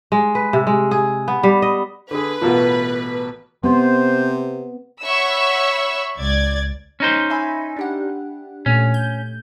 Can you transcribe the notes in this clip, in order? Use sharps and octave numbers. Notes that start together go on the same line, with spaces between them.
G#3
B4
C3
G#3
G#4
B3
G3
D#5
D3 G#4 B4
A1 B2 F4 F#4 A#4
C3 B3 C5
C#5 E5 F#5 B5 C#6 E6
C#2 D5 G#6 A6
C#4 D#4 C5
E5 G#5 B5
D4 G4 F#5
A#2 A3 C#4
G6